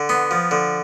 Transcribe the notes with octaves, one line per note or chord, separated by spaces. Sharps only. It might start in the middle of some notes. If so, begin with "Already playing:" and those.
Already playing: D3
B3 C6
F3
D3